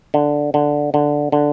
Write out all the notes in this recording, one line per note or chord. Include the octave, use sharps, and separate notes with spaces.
D3
D3
D3
D3